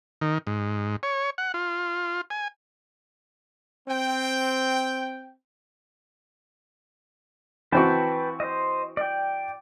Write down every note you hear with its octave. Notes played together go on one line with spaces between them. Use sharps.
D#3
G#2
C#5
F#5
F4
G#5
C4 G5
E3 C4 F#4 B4 G5 A5
C5 D#5
D5 G5